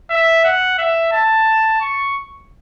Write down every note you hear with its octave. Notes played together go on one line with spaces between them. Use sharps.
E5
F#5
E5
A5
C#6